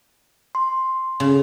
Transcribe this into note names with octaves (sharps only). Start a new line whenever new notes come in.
C6
C#3